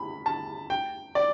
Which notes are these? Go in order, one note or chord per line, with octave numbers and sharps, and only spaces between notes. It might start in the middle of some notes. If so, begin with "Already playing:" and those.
Already playing: B5
A5
G5
D5